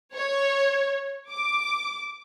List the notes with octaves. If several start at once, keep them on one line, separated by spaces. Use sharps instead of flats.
C#5
D6